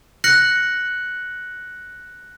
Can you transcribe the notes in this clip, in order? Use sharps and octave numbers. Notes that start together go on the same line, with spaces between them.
F6 F#6 A#6 C#7 F#7